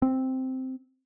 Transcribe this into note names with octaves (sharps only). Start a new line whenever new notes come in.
C4